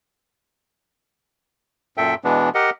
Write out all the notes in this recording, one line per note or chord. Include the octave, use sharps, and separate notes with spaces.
F#2 A#2 A4 E5 G5
B2 E3 G#3 B3 D4
G4 A#4 D#5 F#5